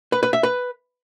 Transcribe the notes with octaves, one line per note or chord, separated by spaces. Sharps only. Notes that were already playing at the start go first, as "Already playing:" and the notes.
B4
B4
E5
B4